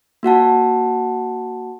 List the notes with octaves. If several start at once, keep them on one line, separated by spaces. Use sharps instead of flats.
A#3 F#4 F#5 A5